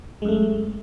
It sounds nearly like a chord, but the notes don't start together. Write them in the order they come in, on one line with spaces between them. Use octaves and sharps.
G#3 F#2 A3